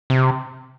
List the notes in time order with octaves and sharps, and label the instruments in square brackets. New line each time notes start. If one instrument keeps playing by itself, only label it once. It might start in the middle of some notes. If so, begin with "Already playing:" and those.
[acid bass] C3